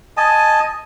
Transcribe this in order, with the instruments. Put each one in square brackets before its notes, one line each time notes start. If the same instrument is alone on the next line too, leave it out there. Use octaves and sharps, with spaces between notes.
[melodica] D#5 G#5 A5